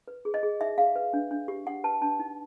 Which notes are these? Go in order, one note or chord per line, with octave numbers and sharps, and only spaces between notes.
B4
G#4
D#5
G#4
D#4 E5
G#4 F5
B4
D4
D4
G4
D4 F#5
B4 A5
D4 A5
D#4